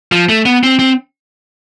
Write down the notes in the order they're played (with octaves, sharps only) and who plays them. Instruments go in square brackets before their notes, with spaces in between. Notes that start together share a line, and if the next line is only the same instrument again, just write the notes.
[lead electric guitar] F3
A3
B3
C4
C4